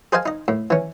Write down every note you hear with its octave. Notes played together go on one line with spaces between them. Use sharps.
G#4 C5 D#5 F5 G#5 A5
D#4 D#5
A2
E3 C#4